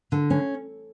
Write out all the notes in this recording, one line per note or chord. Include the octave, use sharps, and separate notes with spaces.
D3
C#4